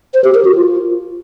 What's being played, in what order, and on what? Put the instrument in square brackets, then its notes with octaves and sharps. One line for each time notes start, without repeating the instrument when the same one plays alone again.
[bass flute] C5
G4
A#4
F#4
F4